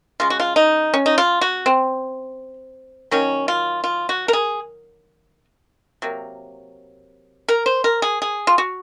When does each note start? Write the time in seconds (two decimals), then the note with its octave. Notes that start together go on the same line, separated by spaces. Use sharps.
0.20 C#3 G#3 F4
0.30 F#4
0.40 F4
0.56 D#4
0.94 C#4
1.06 D#4
1.18 F4
1.41 F#4
1.66 C4
3.11 D#3 F#3 A#3 C#4
3.48 F4
3.84 F4
4.09 F#4
4.28 A#4
4.33 G#4
6.02 C3 F#3 A#3
7.48 A#4
7.66 C5
7.84 A#4
8.02 G#4
8.22 G#4
8.47 F4
8.58 F#4